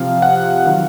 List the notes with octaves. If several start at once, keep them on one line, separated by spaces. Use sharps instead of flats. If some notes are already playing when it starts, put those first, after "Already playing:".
Already playing: C3 F3 C4 F5
F#5
D#3 F#3 F5